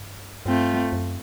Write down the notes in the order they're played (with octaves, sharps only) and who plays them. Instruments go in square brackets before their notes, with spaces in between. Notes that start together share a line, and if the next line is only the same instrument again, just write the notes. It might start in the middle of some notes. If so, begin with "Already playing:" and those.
Already playing: [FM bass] G2
[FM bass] G2 [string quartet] A3 C4 F4
[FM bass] F#2